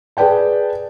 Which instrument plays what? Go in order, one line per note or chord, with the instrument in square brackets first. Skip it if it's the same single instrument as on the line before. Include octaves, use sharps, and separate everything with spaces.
[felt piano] G#4 B4 D5 G5 A5